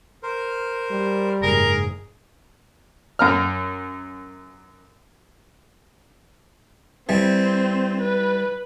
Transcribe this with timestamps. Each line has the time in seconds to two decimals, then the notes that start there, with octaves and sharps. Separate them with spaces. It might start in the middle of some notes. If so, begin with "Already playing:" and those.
0.23 A#4 C5
0.91 G3
1.43 F#1 G#2 G#4 A#4
3.19 F#2 A#5 F6
7.09 E3 G3 C4
8.01 B4